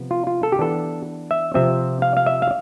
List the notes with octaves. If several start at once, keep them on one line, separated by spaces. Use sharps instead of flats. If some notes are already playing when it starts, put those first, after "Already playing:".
Already playing: C3 F3 B3
F4
F4
A4
G4
E3 B3 D4 A4
E5
C3 F3 C4 E5
F5
F5
E5
F5